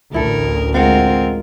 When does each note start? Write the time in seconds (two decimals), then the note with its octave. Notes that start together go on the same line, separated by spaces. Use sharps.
0.14 A1 D2 E4 A4 A#4
0.74 G#3 C4 F4 A#4 F5 F#5